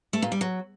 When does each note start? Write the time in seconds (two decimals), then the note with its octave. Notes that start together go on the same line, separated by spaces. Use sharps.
0.13 A3
0.22 A#2
0.32 G3
0.41 F#3